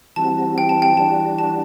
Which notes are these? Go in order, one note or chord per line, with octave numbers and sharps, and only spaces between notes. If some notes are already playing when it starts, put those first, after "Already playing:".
E3 G3 C4 F#4 A5
G5
A5
G5
E3 G3 D4 F#4 A5
A5